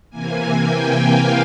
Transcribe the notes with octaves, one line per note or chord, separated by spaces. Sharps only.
C3 E3 A#3 G#5
G5
F5